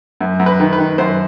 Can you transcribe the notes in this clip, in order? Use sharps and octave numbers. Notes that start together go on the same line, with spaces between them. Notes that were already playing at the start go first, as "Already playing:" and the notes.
F#2
F#2
B4
D#3
B4
D#3
F#2 C5